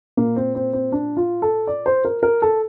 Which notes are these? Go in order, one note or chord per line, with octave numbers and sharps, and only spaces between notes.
A#2 A#3
C4
C4
C4
D4
F4
A4
D5
C5
A#4
A#4
A4